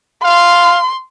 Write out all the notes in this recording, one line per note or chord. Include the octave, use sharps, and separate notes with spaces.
F5 C6